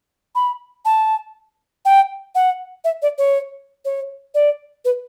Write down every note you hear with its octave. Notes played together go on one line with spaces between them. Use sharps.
B5
A5
G5
F#5
E5
D5
C#5
C#5
D5
B4